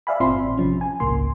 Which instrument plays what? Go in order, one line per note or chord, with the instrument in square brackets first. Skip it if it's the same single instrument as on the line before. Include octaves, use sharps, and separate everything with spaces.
[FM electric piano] D5 E5 F5 G#5 B5
G1 A#2 C4 F4 B5 C6
A1
C3 F3 C#4
G#5
G#1 C#2 A#2 A#3 C6